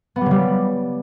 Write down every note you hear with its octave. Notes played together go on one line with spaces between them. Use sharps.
B3
G3
C#3
G3